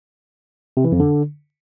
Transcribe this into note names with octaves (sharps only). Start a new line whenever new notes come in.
C3
E3
F2
D3